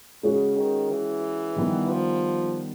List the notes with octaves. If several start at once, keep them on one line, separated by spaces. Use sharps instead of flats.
C#3 G#3 C#4 F#4
D#3
E3
D#3 G3 B3
F3